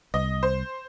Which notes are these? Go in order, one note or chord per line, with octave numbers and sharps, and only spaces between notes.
C2 D#5
C5